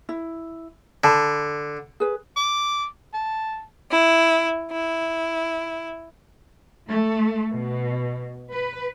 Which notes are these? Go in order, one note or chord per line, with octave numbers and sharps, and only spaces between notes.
E4
D3 A5 B5
G#4 B4
D6
A5
E4
E4
A3
B2
B4